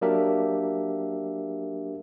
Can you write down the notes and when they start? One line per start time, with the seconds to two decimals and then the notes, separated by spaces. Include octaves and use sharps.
0.01 F#3 A#3 D4 G4 A#4 E5